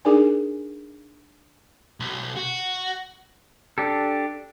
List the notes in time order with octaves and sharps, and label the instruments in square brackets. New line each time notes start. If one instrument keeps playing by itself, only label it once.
[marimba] D4 D#4 G#4 A#4 D5 G#5
[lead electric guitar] B1
F#4
[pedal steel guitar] D4 G4 A4